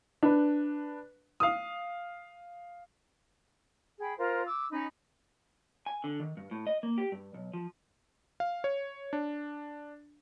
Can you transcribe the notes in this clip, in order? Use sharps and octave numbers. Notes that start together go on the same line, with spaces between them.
D4 B4
F5 D#6
G#4 G5 B5
F4 A#4 C5
D6 E6
C#4 D#4 D#5 B5
G#5
D3
D#3
G2
A2
D#5
A#3
G4
G2
B1
F3
F5
C#5
D4